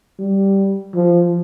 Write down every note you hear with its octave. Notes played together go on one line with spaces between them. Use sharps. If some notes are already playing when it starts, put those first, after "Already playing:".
G3
F3